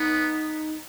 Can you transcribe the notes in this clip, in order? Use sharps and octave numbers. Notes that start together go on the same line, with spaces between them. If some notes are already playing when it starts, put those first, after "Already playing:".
Already playing: B3 D#4